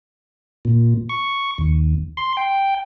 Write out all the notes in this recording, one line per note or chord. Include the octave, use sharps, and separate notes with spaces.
A#2
C#6
D#2
C6
G5